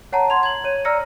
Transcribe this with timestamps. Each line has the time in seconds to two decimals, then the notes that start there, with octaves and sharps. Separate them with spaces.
0.12 C#5 F#5 A5 A#5
0.30 C6 G#6 F7
0.43 G#6 F#7
0.64 C#5 D#7
0.85 D5 A#5 E6 F6 A#6 C#7